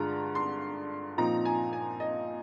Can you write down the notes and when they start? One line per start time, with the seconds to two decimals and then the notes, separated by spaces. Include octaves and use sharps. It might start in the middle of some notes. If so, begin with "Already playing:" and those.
Already playing: G2 D3 G#3 D4 F4 A#5
0.35 C6
1.17 A#2 F3 C4 D#4 A#5
1.45 G#5
1.73 G#5
2.00 D#5